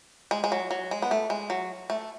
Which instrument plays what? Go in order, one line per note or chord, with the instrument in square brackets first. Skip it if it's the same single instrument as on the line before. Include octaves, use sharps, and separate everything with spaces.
[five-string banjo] G#3
G#3
F#3
F#3
G#3
B3
A3
G#3
F#3
A3